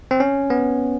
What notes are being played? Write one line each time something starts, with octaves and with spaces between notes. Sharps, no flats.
C4
C#4
B3